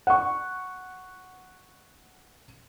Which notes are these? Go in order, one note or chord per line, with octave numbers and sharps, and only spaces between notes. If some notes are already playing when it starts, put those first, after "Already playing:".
F#5 C#6